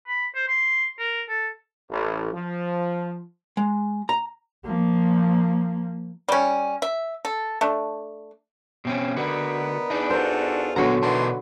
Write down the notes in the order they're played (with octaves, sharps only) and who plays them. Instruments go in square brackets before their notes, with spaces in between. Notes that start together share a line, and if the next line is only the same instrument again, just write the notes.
[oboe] B5
C5
C6
A#4
A4
[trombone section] A1
F3
[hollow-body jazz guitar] G#3
A#5
[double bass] F3 A#3
[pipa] G3 C#4
E5
A4
A3 D4
[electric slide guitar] B2 C4 C#4
[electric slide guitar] D3 F#4 [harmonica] B3 B5 [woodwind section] D4 D#4 A#4
[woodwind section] E2 [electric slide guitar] D4 D#4
[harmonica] F4 F#4 A4 [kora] A#4 C5
[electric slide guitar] A#2 B3 A#5 [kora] D3 F#3 F#4 [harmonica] G#3
[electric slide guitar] B2 A#4 A5 [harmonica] E3 D#4 C6 [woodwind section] D4 B4